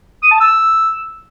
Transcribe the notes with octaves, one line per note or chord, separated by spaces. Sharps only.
D#6
A5
E6